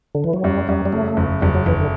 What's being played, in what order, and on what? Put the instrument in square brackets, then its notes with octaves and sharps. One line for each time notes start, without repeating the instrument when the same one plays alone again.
[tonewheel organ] D3
E3
F#3
[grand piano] F#2 [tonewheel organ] G3
[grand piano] F#2 [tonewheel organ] G3
[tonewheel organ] G3
[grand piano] C#3 [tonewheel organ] A3
[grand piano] F#1
[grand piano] F#1 [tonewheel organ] G3
[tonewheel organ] F#3
[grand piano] F#1 [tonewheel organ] E3
[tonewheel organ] D3